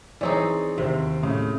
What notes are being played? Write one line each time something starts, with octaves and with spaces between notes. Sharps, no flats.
E3 C4 D#4 G#4 C#5 D5
D#2 C3 C4
A2 C#3